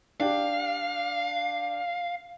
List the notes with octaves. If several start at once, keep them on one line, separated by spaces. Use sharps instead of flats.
D4 G4 F5